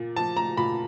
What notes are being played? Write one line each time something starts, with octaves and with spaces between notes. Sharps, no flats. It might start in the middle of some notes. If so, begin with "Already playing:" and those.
Already playing: A#2
F3 A5
A#5
A#2 B5